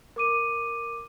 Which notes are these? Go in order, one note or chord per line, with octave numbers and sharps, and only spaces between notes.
A#4 D6 D#7